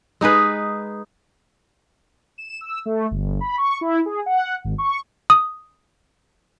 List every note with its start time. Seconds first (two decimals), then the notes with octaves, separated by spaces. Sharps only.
0.21 G#3 D#4 G#4 B4
2.38 E7
2.61 E6
2.86 A3
3.11 G1
3.41 B5
3.58 C#6
3.81 E4
4.06 G#4
4.26 F#5
4.64 G#1
4.78 C#6
5.30 D#6